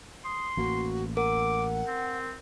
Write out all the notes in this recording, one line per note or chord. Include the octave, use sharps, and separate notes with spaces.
C6 D#6
A1 A#3 F#4
A#4 F#5 D6
C4